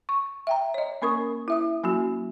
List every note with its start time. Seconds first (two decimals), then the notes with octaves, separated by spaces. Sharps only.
0.09 C#6
0.47 E5 G5 A#5
0.74 C#5 D#5
1.02 A#3 C#4 A#4 C#6 D#6
1.48 E4 E5 D#6
1.84 F#3 A#3 C#4 F#4